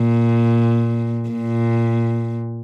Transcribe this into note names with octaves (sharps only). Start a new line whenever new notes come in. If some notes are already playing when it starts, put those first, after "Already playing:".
Already playing: A#2
A#2